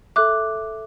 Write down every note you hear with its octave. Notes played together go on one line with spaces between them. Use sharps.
A4 E5 D6 F#6